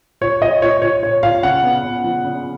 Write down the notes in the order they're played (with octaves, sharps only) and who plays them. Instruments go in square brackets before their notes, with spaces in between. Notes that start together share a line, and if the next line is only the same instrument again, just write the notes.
[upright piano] A#2 [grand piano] C#5
[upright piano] A#2 [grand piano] D#5
[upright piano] A#2 [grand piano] C#5
[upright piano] A#2 [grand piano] C#5
[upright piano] A#2 [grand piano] C#5
[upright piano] A#2 [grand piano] F5
[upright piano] C#3 [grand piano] F#5
[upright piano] B3
C#3
F3
C#3